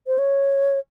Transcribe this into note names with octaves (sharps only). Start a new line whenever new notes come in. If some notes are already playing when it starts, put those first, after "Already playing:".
C5
C#5